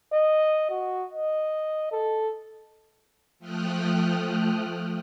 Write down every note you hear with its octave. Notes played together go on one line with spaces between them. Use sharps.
D#5
F#4
D#5
A4
F3 A3 G5 D#6 F6 F#6